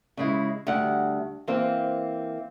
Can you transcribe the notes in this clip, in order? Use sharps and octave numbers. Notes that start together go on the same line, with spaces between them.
C#3 G#3 E4
D2 G3 F#5
E3 A#3 C4 C5